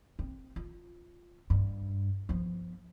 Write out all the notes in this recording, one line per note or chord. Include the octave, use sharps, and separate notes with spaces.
C4
F4
G2
F3 B3